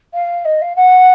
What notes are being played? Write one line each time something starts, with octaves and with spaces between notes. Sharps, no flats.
F5
D#5
F5
F#5